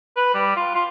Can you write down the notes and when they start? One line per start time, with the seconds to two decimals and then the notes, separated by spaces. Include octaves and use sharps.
0.16 B4
0.34 G3
0.56 F4
0.75 F4